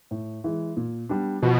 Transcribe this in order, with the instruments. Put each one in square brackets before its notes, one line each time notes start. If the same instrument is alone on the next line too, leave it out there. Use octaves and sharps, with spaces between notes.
[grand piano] A2
E3 G#3
A#2
G3 B3 D4
[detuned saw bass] B2 [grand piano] F3